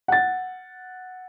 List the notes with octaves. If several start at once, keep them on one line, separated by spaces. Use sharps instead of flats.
F#5 A6